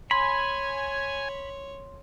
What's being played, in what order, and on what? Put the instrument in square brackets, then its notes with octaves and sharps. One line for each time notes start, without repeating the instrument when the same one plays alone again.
[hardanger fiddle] C#5 [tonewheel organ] G#5 [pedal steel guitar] B5 [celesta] C6